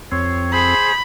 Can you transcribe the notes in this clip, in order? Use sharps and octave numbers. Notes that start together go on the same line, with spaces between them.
F2 C4 C#5
G#4 C5 B5